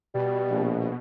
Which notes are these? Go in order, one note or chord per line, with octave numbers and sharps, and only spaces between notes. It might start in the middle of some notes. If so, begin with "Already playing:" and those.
B2 G3
A#1